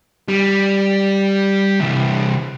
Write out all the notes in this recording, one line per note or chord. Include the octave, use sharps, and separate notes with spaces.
G3
C2 E3